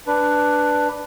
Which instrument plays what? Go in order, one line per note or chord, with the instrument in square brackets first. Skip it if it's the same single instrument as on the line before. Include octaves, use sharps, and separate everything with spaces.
[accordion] D4 B4